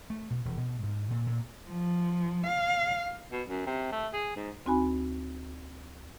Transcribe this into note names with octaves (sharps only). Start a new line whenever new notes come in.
A3
B2
E1
B2
G#2
A#2
A#2
F3
F5
B2
F#2
C3
A3
G#4
G#2
D2 C4 D#4 F#4 G#5 B5